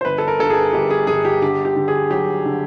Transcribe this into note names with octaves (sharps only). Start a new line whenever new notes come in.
C5
G1 B4
A4
A#4
G2 A4
G#4
G1 G4
G#4
G1 G#4
G4
D3 G4
G4
D3
G#4
F#3 G4
D3